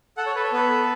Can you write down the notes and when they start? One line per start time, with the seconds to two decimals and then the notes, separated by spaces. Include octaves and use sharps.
0.17 A4 F#5
0.26 C#5
0.35 A4 B4
0.44 C#5
0.53 B3 B4
0.71 A4